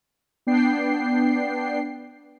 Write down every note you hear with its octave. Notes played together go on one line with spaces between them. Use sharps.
B3 D4 G5 C7